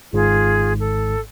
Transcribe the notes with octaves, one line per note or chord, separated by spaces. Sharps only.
G#1 G#2 F4 G#4
A4